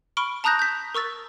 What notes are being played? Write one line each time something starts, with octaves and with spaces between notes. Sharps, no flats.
B5 C#6 F6 D7 G7
A5 A#5 D#6 F#6 G6 A#6
G6 B6
A#4 C#6 E6 A6